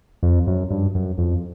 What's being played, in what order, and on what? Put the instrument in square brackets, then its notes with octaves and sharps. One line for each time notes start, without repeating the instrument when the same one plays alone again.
[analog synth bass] F2
F#2
G2
F#2
F2